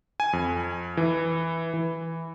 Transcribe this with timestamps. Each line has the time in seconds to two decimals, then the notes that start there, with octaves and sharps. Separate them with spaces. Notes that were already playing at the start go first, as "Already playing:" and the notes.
0.20 G#5
0.33 F2
0.97 E3
1.74 E3